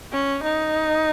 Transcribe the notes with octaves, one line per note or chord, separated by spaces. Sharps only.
C#4
D#4